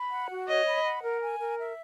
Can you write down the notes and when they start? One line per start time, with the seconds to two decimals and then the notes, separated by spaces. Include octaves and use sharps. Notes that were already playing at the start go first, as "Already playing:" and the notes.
Already playing: B5
0.11 F#5
0.30 F#4
0.48 C#5 D#5
0.66 B5
0.84 F#5
1.02 A#4
1.21 G#5
1.39 A#4
1.59 E5